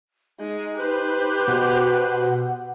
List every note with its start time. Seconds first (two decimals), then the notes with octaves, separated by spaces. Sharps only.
0.40 G#3 D#4
0.78 G4 B4 C5 F#6
1.47 B2 F#5